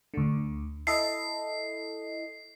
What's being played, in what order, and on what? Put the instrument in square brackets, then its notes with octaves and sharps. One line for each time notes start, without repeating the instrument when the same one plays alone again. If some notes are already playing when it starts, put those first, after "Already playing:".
[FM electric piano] D2 D3
[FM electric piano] E4 A4 D#5 [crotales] C7